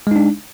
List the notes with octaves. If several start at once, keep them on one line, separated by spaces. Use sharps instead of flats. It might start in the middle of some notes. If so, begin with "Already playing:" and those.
G#3 D4 D#4